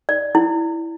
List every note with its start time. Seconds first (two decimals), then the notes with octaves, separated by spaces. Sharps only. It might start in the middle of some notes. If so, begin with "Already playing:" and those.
0.09 D5
0.35 E4